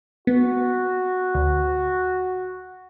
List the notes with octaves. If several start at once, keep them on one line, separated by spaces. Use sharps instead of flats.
B3 F#4
D2